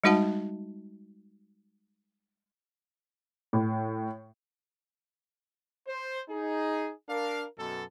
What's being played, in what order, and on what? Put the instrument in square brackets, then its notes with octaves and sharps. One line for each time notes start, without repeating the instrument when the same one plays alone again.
[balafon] G3 G#3 D#4 F#4 F#5 A5
[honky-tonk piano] A2
[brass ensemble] C5
D#4 G#4
D4 A#4 F5
F#2 B2 A4